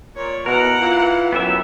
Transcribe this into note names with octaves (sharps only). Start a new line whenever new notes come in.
A#2 C#5
B2 E3 A#4 F#5
E3 F4
F#2 B3 G4 E5